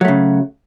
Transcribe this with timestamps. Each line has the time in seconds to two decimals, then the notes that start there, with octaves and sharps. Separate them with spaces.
0.01 F#3
0.05 A3
0.08 C#3